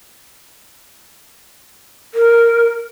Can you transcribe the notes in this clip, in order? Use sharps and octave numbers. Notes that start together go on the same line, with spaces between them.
A#4